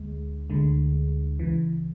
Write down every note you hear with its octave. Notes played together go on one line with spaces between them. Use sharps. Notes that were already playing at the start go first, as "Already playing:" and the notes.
Already playing: D2 D3 G#3
D2 D3 G#3
C#2 C#3 E3